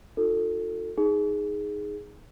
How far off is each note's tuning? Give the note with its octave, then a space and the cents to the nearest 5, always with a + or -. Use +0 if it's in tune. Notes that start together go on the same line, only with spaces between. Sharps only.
D#4 +0 F#4 -45 A4 +20
D#4 +0 G#4 +0